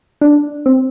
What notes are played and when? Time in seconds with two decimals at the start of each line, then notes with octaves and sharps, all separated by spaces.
0.21 D4
0.66 C4